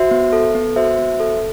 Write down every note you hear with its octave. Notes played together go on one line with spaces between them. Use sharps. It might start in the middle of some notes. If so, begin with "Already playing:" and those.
Already playing: F#4 C5 E5
B3
A4
B3
F#4 C5 E5
B3
A4